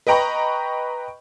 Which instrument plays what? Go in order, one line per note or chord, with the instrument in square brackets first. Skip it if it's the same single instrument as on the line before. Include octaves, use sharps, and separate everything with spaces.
[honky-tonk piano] B4 D#5 G5 A#5 B5 C#6